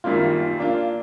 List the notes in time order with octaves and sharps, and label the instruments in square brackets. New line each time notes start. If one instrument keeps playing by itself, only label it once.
[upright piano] F#2 D#3 G3 A#3 [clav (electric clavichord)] F4
[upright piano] A#3 D4 F4